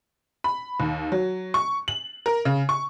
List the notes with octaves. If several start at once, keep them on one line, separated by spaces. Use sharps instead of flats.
B5
D#2
F#3
C#6
F#7
A#4
C#3
C#6